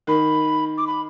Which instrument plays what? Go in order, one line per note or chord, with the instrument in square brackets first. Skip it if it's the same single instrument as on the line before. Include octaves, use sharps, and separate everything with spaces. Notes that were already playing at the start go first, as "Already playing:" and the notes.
[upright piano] D#3 [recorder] B5
[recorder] D6
B5